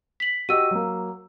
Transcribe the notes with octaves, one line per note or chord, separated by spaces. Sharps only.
B6 F#7
F#4 G4 D#5 E6 D#7
F#3 A#3